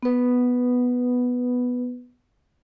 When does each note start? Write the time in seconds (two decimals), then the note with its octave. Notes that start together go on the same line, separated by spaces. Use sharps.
0.03 B3 B4